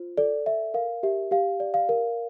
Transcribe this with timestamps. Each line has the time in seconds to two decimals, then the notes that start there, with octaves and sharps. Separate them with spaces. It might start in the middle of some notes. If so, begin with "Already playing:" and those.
Already playing: F4 C5
0.17 A4 D5
0.46 D5 E5
0.74 A#4 F5
1.03 G4 E5
1.31 G4 F5
1.60 D5
1.74 F5
1.89 A#4